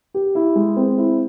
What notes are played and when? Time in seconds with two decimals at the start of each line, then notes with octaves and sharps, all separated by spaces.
0.14 G4
0.35 E4
0.56 G#3
0.77 C4
0.98 E4